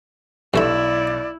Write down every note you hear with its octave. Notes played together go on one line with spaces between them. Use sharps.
B1 G2 A3 E4 D5 B5 E7